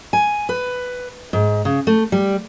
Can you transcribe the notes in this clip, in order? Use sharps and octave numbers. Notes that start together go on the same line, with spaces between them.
G#5
B4
G#2
C#3
A3
G3